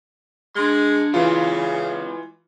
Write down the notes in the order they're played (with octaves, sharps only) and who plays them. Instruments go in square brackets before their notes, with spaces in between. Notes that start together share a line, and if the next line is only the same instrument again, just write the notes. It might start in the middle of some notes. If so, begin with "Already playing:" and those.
[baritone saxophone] G#3 [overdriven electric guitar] D4 C6
[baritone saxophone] C#3 [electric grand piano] E3 F4 [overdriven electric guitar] G#3 G4